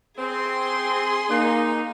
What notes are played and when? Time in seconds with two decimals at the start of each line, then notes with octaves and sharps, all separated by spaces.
0.19 C4 G#4 C6
1.30 A#3 D#4